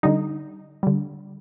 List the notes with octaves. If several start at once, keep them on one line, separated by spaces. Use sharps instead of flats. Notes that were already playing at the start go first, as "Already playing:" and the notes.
D3 G3 D#4
D3 G3